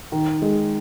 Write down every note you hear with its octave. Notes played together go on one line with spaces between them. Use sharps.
D#3
G#3